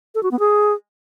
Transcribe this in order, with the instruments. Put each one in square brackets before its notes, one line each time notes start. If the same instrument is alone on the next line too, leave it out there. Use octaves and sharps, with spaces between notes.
[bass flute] A4
F#4
B3
G#4